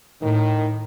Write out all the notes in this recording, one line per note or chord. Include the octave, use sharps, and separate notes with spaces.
A2 D#3